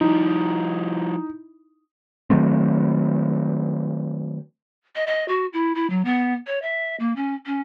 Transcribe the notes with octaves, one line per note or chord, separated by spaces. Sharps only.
F3 G3 D#4 E4
D#3 F#3 A3 C4
D#5
D#5
F#4
E4
E4
F#3
B3
C#5
E5
A#3
C#4
C#4